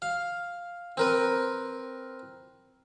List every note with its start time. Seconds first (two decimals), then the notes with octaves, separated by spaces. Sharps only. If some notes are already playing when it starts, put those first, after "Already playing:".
0.02 F5
0.97 C4 A#4 B4